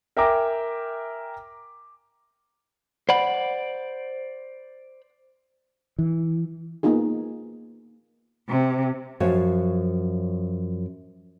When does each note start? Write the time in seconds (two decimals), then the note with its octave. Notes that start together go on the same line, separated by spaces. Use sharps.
0.17 A#4 E5 G5 G#5 A#5 D6
3.09 C5 D5 F#5 B5
5.98 E3
6.83 A#3 B3 D#4 F4 G#4
8.49 C3
9.20 F#2 F3 F#4 C#5 F5